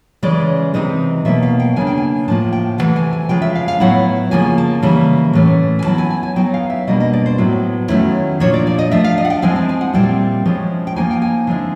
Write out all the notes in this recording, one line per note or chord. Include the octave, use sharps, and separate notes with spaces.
C#3 E3 G#3 C#4 D5
C3 E3 G#3 C4 D#4 D#5
B2 F#3 A#3 E5
F5
G5
C#3 F3 A#3 D4 G#5
G5
G#5
A2 F3 A#3 A5
G5
C3 E3 A3 F#5
G#5
G#5
C#3 F3 G#3 G5
E5
F5
F5
A2 F#3 B3 E4 F#5
C#3 F3 A#3 G#5
A5
C#3 E3 G3 A#3
A2 E3 A3 C#4
G#5
F#3 B3 E4 A5
G#5
G#5
G#5
F#3 B3 D#4 G5
F5
E5
B2 G3 A#3 D4 D#5
D#5
D5
C5
A2 F#3 B3 E4
D#3 F#3 A3 C#4 E4
A#2 F3 A#3 D4 C#5
D5
D5
D#5
F3 A3 D4 E5
F5
D#5
F#5
G5
F3 G#3 C4 E4 G#5
A5
G#5
F#5
A#2 G3 C4 E4 G5
F3 G#3 C#4 E4
G5
F3 A#3 D#4 G#5
G5
G#5
D3 F3 G#3 C4 E4